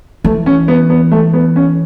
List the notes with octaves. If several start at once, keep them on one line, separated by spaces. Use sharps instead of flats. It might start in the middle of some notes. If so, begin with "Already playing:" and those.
E3 A3
C#4
B3
B3
A3
B3
C#4